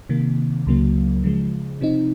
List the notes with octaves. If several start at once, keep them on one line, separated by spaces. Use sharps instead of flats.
C3 D#3 A#3
C#2 C#3 F#3 A#3
C#3 F3 G#3
C3 F3 C4 D#4